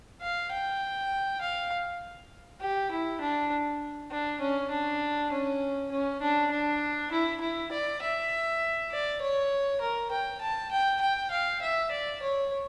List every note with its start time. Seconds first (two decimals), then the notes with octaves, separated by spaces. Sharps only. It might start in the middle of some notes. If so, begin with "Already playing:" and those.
0.21 F5
0.51 G5
1.41 F5
2.61 G4
2.91 E4
3.21 D4
4.11 D4
4.40 C#4
4.71 D4
5.32 C#4
5.92 C#4
6.22 D4
6.51 D4
7.12 E4
7.41 E4
7.72 D5
8.02 E5
8.91 D5
9.21 C#5
9.81 A#4
10.11 G5
10.41 A5
10.71 G5
11.01 G5
11.31 F5
11.62 E5
11.91 D5
12.22 C#5